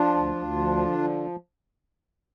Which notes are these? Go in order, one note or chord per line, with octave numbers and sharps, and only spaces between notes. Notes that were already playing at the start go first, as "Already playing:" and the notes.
Already playing: F3 D4 F4
D2
D2
F3
D3
F3